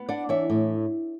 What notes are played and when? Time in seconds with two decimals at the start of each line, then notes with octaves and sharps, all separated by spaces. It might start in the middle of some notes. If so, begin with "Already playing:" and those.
Already playing: B3
0.09 D4 D5 F#5
0.29 E3 C#5 E5
0.50 A2